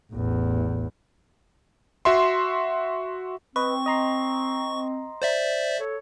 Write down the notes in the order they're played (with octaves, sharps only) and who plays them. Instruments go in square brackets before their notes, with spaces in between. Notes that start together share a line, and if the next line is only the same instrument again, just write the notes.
[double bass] A1 E2
[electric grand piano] F#4 E5 C6
[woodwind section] C4 [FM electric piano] B4 D#5 [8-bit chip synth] C#6
[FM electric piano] D#5 A#5 C6
[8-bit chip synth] C5 D5 E5
[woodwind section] A4 C#5